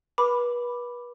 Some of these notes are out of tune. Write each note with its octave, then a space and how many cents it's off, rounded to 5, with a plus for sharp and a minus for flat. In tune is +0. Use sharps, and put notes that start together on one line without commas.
B4 -35 B5 +0 D6 +0